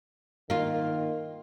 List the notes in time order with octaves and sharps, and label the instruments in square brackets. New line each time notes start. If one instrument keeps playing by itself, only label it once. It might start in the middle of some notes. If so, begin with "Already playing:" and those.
[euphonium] D#3 [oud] A#3 F4